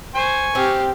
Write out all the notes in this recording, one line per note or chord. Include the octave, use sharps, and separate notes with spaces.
C5 G#5 C#6
C4 G4 F5